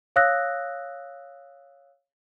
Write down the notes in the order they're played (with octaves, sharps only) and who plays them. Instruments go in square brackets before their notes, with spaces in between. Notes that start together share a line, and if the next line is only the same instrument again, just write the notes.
[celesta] C#5 F5 D#6 E6 F#6 A#6